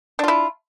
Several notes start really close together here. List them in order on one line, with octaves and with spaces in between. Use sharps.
D4 F4 E4